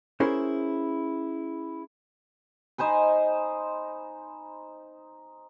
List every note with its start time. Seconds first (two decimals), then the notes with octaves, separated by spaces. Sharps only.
0.20 C#4 E4 G#4 A#4 C5
2.78 D#4 C5 G#5 B5